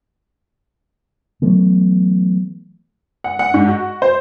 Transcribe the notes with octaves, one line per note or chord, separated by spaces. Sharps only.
E3 F#3 A3 B3
F#5
F#5
G#2
F#4
C5